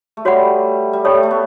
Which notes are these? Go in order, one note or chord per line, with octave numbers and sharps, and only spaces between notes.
A3
G3 F#4 C#5 F#5 B5
G3
A3 A4 C#5 G5
A3
B3